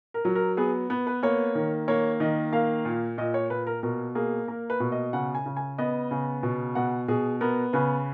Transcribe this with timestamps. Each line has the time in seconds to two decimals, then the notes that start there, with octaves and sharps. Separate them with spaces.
0.14 A#4
0.25 F#3
0.35 A#4
0.57 B3 G#4
0.90 B3
1.07 B4
1.23 A#3 C#5
1.55 D#3
1.88 A#3 C#5
2.20 D#3 D#5
2.52 A#3 F5
2.85 A#2
3.18 A#2 D#5
3.34 C#5
3.50 A#2 B4
3.67 A#4
3.83 B2 A#4
4.15 A#3 G#4
4.48 A#3 A#4
4.70 B4
4.80 B2
4.92 D#5
5.13 C#3 F#5
5.35 G#5
5.46 C#3
5.57 G#5
5.78 B3 D#5
6.11 C#3
6.43 B2
6.75 B2 F#5
7.08 B2 G#4
7.41 B3 A#4
7.73 C#3 B4